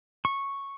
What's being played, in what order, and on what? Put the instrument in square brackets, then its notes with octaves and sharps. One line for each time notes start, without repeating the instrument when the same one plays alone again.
[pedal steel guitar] C#6